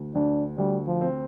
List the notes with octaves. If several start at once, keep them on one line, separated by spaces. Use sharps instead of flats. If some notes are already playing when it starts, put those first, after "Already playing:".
Already playing: D2
D2 D4
D2 G3
F3
C4